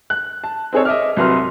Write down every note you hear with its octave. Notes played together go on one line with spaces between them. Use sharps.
F#6
A5
C4 D#4 G#4 A4 C#5
D#5 E5 D6 F6
C2 F#3 B4 C6 F6